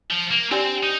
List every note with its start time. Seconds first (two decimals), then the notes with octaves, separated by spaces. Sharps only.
0.10 F3
0.31 A#3
0.51 C4 D4 G4 D5 G#5
0.83 D#4